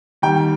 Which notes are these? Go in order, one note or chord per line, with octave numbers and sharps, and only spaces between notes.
D#2 D#3 G3 G5